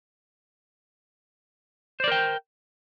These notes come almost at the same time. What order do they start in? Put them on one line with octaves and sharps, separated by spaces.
C5 D5 A#4 G5